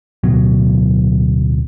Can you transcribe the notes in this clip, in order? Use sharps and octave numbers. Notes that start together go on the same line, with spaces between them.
D1 B2 F#3